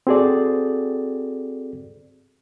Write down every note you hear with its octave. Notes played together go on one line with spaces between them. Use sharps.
C4 F#4 G#4 A4 D5